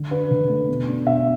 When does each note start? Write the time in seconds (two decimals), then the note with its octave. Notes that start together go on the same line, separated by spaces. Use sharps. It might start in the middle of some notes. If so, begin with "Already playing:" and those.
Already playing: D3
0.11 D4 B4
0.31 D3
0.49 A3
0.68 B2
0.88 D4
1.06 B2 E5